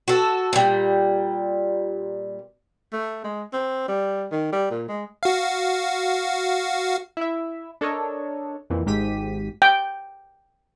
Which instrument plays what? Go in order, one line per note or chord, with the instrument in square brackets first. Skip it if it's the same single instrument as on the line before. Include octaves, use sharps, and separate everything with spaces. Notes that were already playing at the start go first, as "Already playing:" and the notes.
[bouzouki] F#4 A4
A#2 G3
[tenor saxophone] A3
G#3
C4
G3
D#3
G3
A#2
G#3
[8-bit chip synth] F#4 F5
[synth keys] E4 E5
D4 A4 A#4 C#5 D#5
F2 A#2 E3
G#1 G#2 G4 B6 D#7
[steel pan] G5